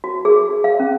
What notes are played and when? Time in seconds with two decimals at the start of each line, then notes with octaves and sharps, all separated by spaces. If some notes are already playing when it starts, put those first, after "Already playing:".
0.04 F#4
0.25 G#4
0.64 F5
0.80 C#4